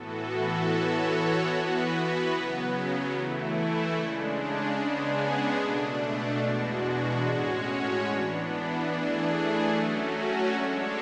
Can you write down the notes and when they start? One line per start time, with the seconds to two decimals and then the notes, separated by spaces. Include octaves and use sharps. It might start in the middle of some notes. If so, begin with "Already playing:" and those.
Already playing: A2 E3 B3 F#4 A4
0.64 E3 B3 F#4 A4 C#5
1.47 E3 B3 F#4 B4
2.28 C#3 F#3 B3
3.12 E3 A3 E4
3.93 C#3 G#3 D4
4.75 C#3 G#3 B3 D4 G#4
5.58 B2 A3 D4
6.39 E2 B2 G#3 D4 F#4
7.21 A2 G#3 C#4 F#4 C#5
8.04 E3 B3 D4
8.86 E3 A3 D4 G#4
9.69 F#3 A3 C#4 F#4
10.50 G#3 D4 A4 C#5